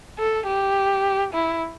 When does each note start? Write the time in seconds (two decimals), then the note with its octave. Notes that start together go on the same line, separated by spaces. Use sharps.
0.19 A4
0.47 G4
1.33 E4